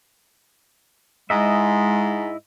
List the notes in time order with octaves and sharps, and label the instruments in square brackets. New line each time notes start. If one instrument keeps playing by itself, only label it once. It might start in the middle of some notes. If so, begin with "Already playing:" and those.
[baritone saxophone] G#2 [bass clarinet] G#3 [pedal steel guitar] E4 D#5 E5